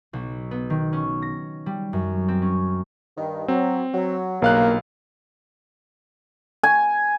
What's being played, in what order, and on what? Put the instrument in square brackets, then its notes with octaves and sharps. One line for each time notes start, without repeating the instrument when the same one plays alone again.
[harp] B1
B3
D#3
C#4
A#6
G3
F#2
C4
C#4
[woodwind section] G2 D#3
[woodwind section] F#3 [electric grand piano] C4
[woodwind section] F#3
[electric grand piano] B1 F5 F#6 [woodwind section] G2 A#2 C#3 [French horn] A#3
[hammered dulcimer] G#5